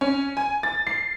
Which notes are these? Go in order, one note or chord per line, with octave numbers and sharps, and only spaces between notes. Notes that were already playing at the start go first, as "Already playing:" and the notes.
C#4
G#5
A6
C7